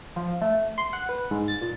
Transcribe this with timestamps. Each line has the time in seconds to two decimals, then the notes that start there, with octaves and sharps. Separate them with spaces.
0.16 F3
0.42 A3
0.78 C6
0.93 F#5
1.09 B4
1.31 G#2
1.48 A6
1.61 A#2